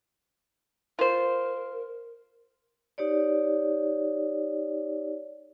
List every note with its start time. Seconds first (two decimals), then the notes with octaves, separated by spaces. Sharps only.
0.99 F4 A#4 C5
2.98 D#4 G4 C#5 D5